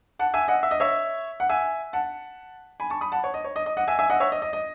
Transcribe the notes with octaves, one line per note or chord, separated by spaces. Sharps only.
F#5 A5
E5 G#5
D#5 F#5
E5
D#5
C#5 E5
F#5
E5 G#5
F#5 A5
G#5 B5
A5 C#6
B5 D#6
F#5 A5
C#5
D#5
C#5
D#5
D#5
D#5 F#5
E5 G#5
E5 G#5
D#5 F#5
C#5 E5
D#5
D#5
D#5